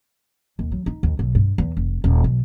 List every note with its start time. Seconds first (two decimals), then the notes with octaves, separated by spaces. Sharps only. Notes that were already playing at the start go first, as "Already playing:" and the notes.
0.59 D#2
0.72 F#3
0.86 D#4
1.03 D#2
1.19 B1
1.35 G2
1.58 E2
1.77 F1
2.04 D#1
2.24 B1